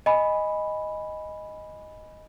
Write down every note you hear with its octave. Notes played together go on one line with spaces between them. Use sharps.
D#5 G#5 B5